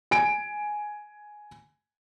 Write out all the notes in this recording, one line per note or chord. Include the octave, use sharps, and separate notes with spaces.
G#5 D7